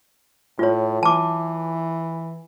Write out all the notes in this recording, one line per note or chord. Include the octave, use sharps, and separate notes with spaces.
A2 F4 C#5
E3 A5 D6